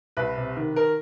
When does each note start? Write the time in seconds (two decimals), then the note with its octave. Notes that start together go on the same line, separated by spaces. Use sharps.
0.17 C2 B4
0.37 C3
0.57 D#3
0.76 A#4